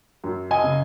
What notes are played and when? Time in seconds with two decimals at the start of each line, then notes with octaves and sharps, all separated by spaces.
0.24 F#2
0.51 D#5 G#5
0.64 C#3